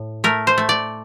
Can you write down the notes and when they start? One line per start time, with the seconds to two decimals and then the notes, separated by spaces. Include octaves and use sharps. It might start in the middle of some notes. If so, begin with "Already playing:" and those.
Already playing: A2
0.24 A3 A#4
0.47 C5
0.58 A3
0.69 D5